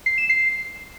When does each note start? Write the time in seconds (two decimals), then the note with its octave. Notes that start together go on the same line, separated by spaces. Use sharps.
0.06 C7
0.18 E7
0.29 C7